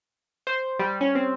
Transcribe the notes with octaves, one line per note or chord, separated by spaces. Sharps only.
C5
G3
C#4
C4